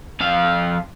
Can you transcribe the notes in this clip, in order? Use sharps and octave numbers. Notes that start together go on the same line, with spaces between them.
F2 F5